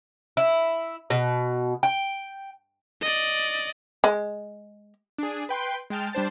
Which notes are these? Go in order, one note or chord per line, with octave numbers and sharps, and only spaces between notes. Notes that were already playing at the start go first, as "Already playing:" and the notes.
E4
B2
G5
D5 D#5
G#3
D4 G#4
B4 G5 C6
G#3 G5 A5 F6
G3 D4 C5 A5